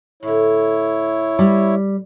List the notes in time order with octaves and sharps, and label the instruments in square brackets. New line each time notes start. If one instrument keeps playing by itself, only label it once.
[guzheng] A2 D3 [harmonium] E4 C#5
[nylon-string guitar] G3